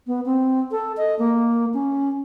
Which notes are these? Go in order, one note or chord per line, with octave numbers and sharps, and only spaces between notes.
B3
C4
A4
D#5
A#3
C#4